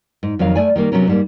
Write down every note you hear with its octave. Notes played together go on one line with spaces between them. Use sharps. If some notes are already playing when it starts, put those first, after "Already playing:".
G#2
F2 D#3 F#3 C#5 F5
A3 D5 G#5
D#3 G3 A#3
C3 F#3 B3 C#4 A#4
G#2 G3 A#3